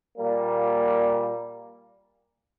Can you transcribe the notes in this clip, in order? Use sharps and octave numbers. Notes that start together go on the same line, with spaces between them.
A#2 G3 A#3